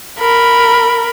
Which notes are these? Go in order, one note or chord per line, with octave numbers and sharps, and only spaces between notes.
A#4 B5